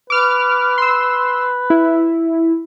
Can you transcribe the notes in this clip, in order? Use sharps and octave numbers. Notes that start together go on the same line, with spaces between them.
B4 D6 F6
C6 E6
E4